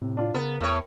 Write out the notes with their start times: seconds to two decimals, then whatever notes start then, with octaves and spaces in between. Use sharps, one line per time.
0.02 A2 C3
0.17 D4 F4
0.34 C#3 B3 A#4
0.61 E2 A2 C#5